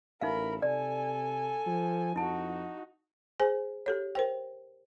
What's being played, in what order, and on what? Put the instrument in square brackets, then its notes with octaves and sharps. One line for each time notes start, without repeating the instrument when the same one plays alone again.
[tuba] A1 [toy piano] D#4 E5 F5 [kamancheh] A#4 B5
[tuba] C3 [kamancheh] A4 G#5 [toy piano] D5
[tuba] F3
[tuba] F2 [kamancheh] D#4 F#4 [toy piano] E4 A5
[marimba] G#4 C5 G#5
G4 A4 C#5
A#4 C5 G5